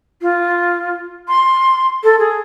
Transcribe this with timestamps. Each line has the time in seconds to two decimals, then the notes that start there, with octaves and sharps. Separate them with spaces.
0.22 F4
1.29 C6
2.03 A4
2.19 G#4